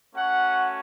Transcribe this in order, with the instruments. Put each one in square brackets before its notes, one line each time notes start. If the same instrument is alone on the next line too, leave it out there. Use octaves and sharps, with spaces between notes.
[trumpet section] A3 C#4 F#4 F#5